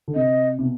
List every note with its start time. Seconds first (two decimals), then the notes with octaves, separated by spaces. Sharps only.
0.08 D3
0.15 C3 D#5
0.59 C3
0.62 B2